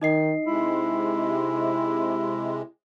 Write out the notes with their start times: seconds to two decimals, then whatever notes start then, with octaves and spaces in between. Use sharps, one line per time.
0.01 D#3 D#4 D#5 C7
0.47 C3 G#3 E4